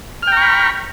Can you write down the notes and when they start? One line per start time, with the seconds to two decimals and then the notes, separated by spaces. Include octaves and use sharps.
0.23 F6
0.27 G5
0.32 A#5
0.37 C#6
0.42 B5